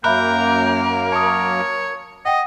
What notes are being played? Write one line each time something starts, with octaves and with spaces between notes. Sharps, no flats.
F#2 A#3 A#4 E5 G5 B5 F#6
C#5 A5 D#6
D#5 F#5 G5